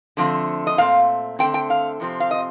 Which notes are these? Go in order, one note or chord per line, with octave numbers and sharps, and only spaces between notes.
D3 F3 A3 C4
D#5
A#2 A3 C4 F5
D3 A3 C4 G5
G5
F5
F2 C3 F3 C4
F5
D#5